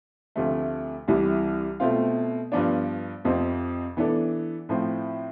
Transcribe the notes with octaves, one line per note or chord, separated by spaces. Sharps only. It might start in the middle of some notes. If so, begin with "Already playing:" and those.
D2 C3 F3 A3
C2 C3 E3 G3
B2 A3 C4 F4
G2 F3 B3 D4
F2 C3 F3 C4
E3 B3 D4 A4
A2 F3 C4